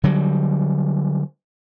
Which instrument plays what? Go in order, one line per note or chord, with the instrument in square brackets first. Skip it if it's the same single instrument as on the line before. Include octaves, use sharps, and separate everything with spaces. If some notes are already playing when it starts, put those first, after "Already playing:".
[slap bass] D3 F#3 G3